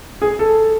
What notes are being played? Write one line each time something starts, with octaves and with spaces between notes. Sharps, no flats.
G#4
A4